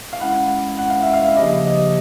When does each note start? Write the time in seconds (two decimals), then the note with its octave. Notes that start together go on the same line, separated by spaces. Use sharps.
0.13 F5
0.20 G#3 C#4 E4 F#5
0.78 F#5
0.90 F5
1.02 E5
1.14 F5
1.27 E5
1.36 C#3 F3 A#3 D4 G4 D#5
1.65 D#5